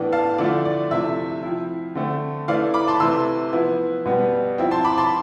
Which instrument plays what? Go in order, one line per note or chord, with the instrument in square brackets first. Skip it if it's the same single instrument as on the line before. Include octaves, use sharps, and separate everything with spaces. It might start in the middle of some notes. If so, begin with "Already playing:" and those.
Already playing: [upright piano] A2 E3 B3 D4
F5 A5
D3 F3 A3 E4 D5
D5
C3 F3 A3 E4 E5
F3 C4 E4
D3 A3 C4
E3 A3 E4 D5 F5
B5 D6
A5 C6
C3 E3 A3 C6 E6
F3 B3 E4
B2 G3 B3
F3 C4 E4
A5 C6
B5 D6
A5 C6